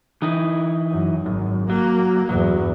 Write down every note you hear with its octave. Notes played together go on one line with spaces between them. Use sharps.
E3 D#4 E4
F#2
G#1 F#2
F#3 A#3
E2 G2 F#3